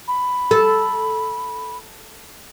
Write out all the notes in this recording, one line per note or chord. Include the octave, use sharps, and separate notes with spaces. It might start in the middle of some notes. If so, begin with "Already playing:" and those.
B5
A4